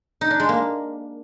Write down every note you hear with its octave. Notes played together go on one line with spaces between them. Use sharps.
D#4
D4
G#3
A#3